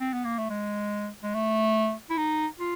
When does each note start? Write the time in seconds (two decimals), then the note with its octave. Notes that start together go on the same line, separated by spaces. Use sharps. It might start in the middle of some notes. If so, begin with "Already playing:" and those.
0.00 C4
0.13 B3
0.25 A#3
0.38 A3
0.50 G#3
1.23 G#3
1.34 A3
2.10 E4
2.17 D#4
2.60 F4